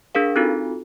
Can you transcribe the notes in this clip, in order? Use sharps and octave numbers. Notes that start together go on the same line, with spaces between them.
D4 G#4 A#4 F5
C4 D#4 F4 F#4 A4